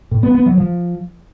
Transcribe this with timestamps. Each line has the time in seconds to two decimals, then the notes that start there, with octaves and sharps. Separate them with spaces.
0.11 A2
0.23 B3
0.35 B3
0.46 F#3
0.58 F3